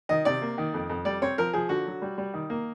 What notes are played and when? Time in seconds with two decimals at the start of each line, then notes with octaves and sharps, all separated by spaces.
0.09 D#3 D#5
0.25 C3 D5
0.42 A#3
0.58 D#3
0.74 F2
0.89 F2
1.05 G3 D5
1.22 C4 C#5
1.38 F3 A#4
1.53 F3 G#4
1.69 D3 F#4
1.86 F#3
2.02 G3
2.18 G3
2.34 D#3
2.50 A#3